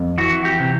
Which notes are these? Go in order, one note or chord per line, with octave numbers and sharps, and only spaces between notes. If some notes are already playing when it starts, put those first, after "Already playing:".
Already playing: F2
E3 F#4
G4
C3